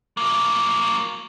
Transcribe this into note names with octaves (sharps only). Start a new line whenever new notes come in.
F#3 A#3